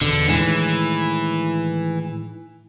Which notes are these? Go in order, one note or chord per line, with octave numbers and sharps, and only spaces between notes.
E2 B2 D3
A2 D#3 E3 G#3